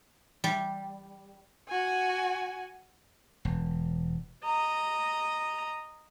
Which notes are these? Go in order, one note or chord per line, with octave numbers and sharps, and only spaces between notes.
G3
F#4 G#5
E1
D#5 A#5